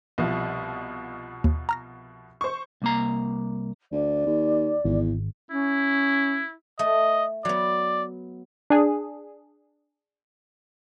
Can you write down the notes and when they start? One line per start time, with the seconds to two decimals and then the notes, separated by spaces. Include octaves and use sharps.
0.18 C2 B2 F3
1.44 D#2
1.69 A#5 F6 A#6
2.41 C5 C#6
2.82 C2 A#3 A#5
3.92 D2 D5
4.26 D#2
4.85 G#1 E2
5.51 C#4 E4
6.79 A3 D#5
7.45 F#3 B3 D5
8.70 D4 G#4